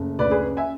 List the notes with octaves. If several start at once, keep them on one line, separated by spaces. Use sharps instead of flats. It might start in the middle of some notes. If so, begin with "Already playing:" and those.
Already playing: F#1 A3
D2 B4 D5
G#4 B4
C#4
E5 G#5